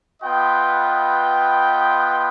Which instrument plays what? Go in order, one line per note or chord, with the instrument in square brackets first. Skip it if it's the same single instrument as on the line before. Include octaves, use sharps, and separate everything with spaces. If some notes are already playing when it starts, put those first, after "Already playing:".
[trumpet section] B3 F4 B4 D#5 G5